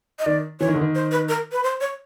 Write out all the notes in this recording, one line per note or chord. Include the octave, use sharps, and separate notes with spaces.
D#5
D#3 D5
E3 C#5
D#3
D3
D#3
C5
B4
A#4
B4
C5
C#5